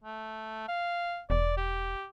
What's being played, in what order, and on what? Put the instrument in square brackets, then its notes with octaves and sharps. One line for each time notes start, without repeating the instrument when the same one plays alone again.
[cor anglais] A3
F5
[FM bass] E1 [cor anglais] D5
[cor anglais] G4